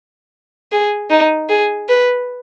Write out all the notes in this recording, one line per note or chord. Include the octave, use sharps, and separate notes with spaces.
G#4
D#4
G#4
B4